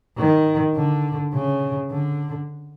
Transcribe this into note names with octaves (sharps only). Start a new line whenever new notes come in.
D#3
D3
C#3
D3